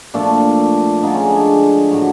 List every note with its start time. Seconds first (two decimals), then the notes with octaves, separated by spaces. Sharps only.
0.14 A#2 F3 A3 D4
1.03 D3 F3 G#3 D#4
1.14 C#4
1.25 D4
1.36 G#4
1.91 A2 F#3 A3